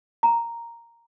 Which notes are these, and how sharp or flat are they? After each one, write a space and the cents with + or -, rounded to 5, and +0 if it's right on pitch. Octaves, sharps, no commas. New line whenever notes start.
A#5 +0